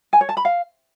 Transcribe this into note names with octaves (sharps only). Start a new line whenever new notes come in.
G#5
C#5
A5
B5
F5